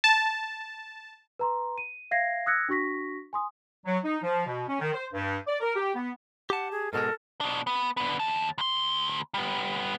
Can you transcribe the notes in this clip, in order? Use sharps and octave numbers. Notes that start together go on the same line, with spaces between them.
A5
B4 A#5 C6
D#7
E5 F5 G#6 A#6 C7
D#6 E6 F#6 G#6 A#6 C#7
D4 F#4 C#6 A#6 B6
G#5 C6 D#6
F#3
D#4
F3
B2
C#4
D#3
C5
G2
D5
A#4
G4
B3
G4 F#5 A5
G#4
G#2 B2 G#3 A4 A#4
B2 D4
B3
D3 B3
D#2 A5
D2 C6
G3 B3